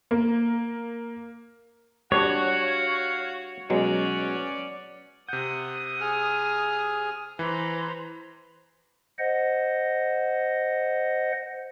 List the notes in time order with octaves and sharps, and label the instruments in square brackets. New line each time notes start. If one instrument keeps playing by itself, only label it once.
[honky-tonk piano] A#3
[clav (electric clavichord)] G3 D4 [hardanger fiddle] F#4 [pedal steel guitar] C#5 [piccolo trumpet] F#5
[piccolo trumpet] F5
[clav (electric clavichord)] B2 F#3 G#3 [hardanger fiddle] C#4 D5 [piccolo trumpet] F#4
[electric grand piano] C3 G6 [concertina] F#5 [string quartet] D#6
[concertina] G#4 F6
[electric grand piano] E3 [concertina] B4 [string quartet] C5 A#5 B5
[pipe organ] C5 D#5 F#5